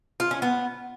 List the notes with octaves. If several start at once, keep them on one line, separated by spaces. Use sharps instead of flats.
F4
C#4
B3